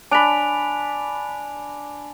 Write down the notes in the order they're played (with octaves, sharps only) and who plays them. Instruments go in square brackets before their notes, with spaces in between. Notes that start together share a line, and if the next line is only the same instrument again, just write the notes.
[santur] D4 B5 [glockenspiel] G#5 D7 F7